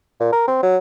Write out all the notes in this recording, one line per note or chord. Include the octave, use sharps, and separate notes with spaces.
A#2
A#4
C4
F#3